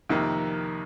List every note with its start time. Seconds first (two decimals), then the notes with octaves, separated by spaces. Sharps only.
0.09 F2 C3 D#3 A#3